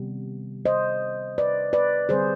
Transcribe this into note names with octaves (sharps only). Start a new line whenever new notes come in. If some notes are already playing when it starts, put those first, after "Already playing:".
Already playing: C3 D#3 G3 B3
C5 D#5
B4 D5
B4 D5
D3 G3 C4 G#4 C5